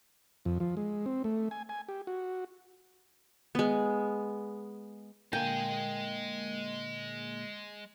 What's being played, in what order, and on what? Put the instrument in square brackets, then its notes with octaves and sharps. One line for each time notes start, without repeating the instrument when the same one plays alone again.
[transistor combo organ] F2
F3
G#3
C4
A3
G#5
G#5
G4
F#4
[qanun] G#3 B3
[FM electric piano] A#2 D3 A#3 [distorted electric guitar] G#3 G#5 [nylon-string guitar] G5